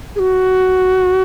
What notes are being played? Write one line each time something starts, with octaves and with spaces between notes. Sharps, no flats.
G#4
F#4